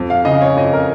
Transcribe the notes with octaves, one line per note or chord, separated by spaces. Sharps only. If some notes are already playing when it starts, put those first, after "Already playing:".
Already playing: F2
F5
C#3 D#5
C#5
F2 D#5
A#4